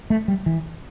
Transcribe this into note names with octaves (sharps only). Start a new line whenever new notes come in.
A3
G3
E3